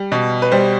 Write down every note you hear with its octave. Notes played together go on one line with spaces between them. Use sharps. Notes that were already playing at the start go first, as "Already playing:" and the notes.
Already playing: G3
B2
B4
G3 C5